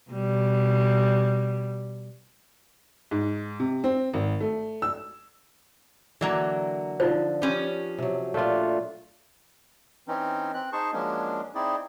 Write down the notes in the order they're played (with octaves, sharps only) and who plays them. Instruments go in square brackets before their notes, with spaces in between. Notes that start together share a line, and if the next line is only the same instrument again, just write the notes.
[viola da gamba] B2 G3
[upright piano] G#2
C3
C4
G#1
A3
E6
[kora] D3 [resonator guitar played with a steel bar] E3 F#3 A#3
[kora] D3 F3 [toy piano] D#4 F4 C5
[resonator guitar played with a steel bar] F3 C#4 [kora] G4 B4 C#5
[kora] C3 F#3
[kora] A#2 D4 [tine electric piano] A3 F4
[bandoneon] E3 C4 C#4 D#4
C4 F#6
D#4 G#4 C5 A5 C#6
F3 F#3 G#3 A#3 C#4 D4
C4 D#4 E4 G#4 D5